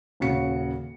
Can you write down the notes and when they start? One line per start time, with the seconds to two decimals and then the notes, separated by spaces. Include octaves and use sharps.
0.20 D#1 C#3 F#4 C#7